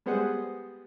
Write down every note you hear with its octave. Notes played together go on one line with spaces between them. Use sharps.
G3 G#3 B3 G#4 C5 F#5